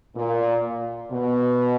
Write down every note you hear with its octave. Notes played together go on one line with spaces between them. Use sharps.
A#2
B2